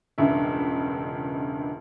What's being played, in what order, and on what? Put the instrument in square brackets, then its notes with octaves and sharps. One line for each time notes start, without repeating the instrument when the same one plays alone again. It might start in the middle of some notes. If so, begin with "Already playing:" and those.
[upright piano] E1 C#2 G2 E5